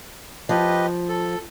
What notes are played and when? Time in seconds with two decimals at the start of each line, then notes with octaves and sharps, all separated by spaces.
0.49 F3 G4 B4 D#5
1.09 A4